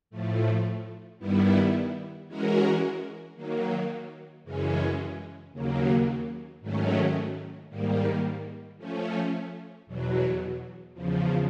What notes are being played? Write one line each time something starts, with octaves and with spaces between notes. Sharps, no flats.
A2 F3 A3
G2 D#3 G3 B3 E4
E3 G#3 C#4 F#4 A#4
D#3 F#3 A#3
F#2 C#3 E3 G#3 C#4
D#2 C#3 F#3 A#3
G#2 D#3 F#3 A3 C#4
G#2 D#3 G3 A#3
F3 A3 C#4
E2 B2 F#3
E2 C#3 F3